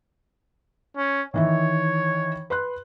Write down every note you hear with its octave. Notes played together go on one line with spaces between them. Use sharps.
C#4
D#3 E3 C#5 E5
B4 C6 F#6